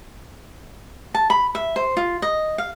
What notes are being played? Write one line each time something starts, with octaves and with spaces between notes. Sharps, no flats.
A5
B5
E5
C5
F4
D#5
F5